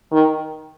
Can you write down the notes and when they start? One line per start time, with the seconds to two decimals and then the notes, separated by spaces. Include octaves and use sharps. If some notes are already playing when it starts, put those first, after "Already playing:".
0.12 D#3